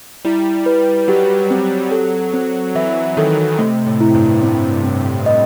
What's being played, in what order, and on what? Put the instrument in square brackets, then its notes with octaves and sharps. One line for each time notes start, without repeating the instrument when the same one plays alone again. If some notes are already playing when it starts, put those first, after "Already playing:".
[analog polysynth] G3 [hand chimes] E4
[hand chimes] B4
[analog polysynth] F#3 [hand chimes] G4
[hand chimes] C4
A4
C4
[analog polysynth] E3 [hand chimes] E5
[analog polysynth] D#3 [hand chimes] A4
[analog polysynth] C3 [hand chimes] A3
[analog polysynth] A2
[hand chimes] E4
[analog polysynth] G2
[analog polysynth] A2 [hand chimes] C4
[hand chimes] C4
D#5